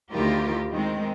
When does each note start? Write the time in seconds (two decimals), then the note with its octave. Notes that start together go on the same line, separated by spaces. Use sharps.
0.12 D2 D#3 E4 F4 G4 A#4
0.73 D#3 G#3 C4